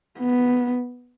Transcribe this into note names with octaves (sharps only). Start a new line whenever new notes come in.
B3